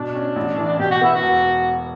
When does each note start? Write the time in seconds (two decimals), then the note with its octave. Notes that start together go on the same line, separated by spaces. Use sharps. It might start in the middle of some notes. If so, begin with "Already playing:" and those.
Already playing: B2 D4
0.15 C#4
0.36 A1
0.58 E3
0.79 B2 G4
0.91 F#4
1.01 B3 E4
1.15 F#4
1.23 E1